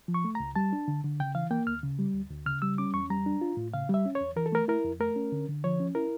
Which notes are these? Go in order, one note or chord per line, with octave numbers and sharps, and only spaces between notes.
F3
C#6
A3
C#2 A#5
G3 A5
D4
D3
D3
C#3 G5
E3 F5
A#3 G5
D2 F6
C#3
G3
D2
D2
C#3 F6
G3 E6
C#4 D6
E2 C#6
G3 A#5
D4
F4
A2
C#3 F5
G3 E5
C#4
C#5
E2
E3 A#4
A4
A3 A#4
E4 A#4
F2
A3 A#4
C#4
D3
D3
F3 C#5
C#4
E4 A#4